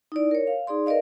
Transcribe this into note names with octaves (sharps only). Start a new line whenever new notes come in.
D#4 E4 D5
A#4 C#5
F5
D#4 G#4 D5 C6
A#4 B4 D5 D#5 F5